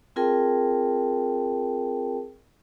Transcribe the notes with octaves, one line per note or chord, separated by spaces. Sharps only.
C4 F4 G#4 A#4 G5 A5